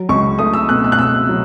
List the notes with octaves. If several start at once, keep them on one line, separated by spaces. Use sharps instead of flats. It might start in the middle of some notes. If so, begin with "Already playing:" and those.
Already playing: F#3
C#2 C#6
A3 D#6
E6
B2 F#6
E6
F#6
B2 E6
F#3